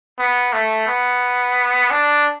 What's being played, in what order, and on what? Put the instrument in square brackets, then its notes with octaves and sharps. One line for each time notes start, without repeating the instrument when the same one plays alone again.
[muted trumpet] B3
A3
B3
D4